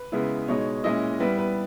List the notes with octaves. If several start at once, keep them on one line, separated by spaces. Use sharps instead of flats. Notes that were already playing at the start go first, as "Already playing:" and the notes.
Already playing: B4
C#3 G#3 B3 E4
B2 G#3 D#4 C#5
A#2 G#3 C#4 E4 D#5
G3 B3 E4 B4
B4